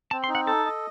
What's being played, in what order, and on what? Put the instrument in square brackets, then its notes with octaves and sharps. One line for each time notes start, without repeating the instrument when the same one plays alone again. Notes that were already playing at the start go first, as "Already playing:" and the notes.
[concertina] C4 [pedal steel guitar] A5
[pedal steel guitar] C6
[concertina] D#4
[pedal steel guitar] F#5
[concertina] A4 [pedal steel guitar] A5
[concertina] D#5